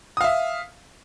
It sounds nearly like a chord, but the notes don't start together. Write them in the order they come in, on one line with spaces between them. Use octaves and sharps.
D#6 F5 E5